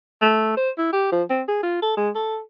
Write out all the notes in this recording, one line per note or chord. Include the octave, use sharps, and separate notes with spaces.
A3
C5
E4
G4
F3
C4
G#4
F4
A4
G#3
A4